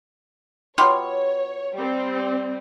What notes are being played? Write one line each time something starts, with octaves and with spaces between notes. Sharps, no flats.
B2 F4 G4 C#5
G3 C4